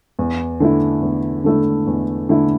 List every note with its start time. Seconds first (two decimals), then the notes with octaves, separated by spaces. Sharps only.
0.19 E2
0.60 D3 A3 E4
1.02 E2
1.44 D3 A3 E4
1.87 E2
2.29 D3 A3 E4